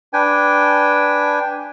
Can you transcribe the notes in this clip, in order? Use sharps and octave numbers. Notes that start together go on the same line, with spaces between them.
D4 B4 G5 G#5